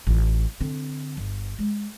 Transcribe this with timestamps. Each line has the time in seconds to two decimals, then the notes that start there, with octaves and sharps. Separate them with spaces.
0.07 A1 F4
0.60 D3 C4
1.17 G1
1.59 G#3